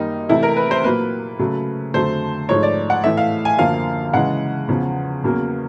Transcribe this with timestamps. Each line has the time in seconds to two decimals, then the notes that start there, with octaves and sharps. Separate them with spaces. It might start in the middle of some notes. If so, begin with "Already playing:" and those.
Already playing: F#2 D#3 G3 A#3 D#4
0.29 C3 E3 A3 E4
0.43 A#4
0.57 B4
0.71 C5
0.84 A#2 F#3 A#3 B4
1.39 C#3 F#3 A3
1.94 F2 D3 F#3 A3 C5
2.49 G#2 F3 A3 C#5
2.63 D5
2.90 F#5
3.04 A2 E3 A3 E5
3.17 F5
3.45 G#5
3.59 F#2 D3 F3 A#3 F5
4.14 C#3 E3 G#3 F#5
4.69 E2 C#3 F3
5.23 E2 C#3 F#3 A#3